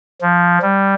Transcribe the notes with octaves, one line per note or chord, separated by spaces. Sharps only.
F3
G3